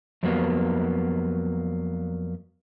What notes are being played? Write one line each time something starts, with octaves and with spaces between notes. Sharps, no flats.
F2 F#3 G3 A#3 B3